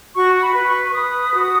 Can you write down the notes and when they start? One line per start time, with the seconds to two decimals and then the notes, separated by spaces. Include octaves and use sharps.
0.14 F#4 C#6
0.41 B5
0.53 B4
0.67 C#6
0.89 C#6
0.93 B4 D#6
1.33 F#4